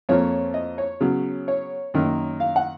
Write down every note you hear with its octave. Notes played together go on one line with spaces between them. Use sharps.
F2 F3 A#3 C#5
D#5
C#5
C#3 F#3 B3
C#5
F#2 D#3 A#3
F5
F#5